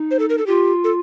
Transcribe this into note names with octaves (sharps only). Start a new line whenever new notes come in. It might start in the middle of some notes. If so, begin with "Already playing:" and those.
Already playing: D#4
C5
A4
A#4
A4
F4 G4
A4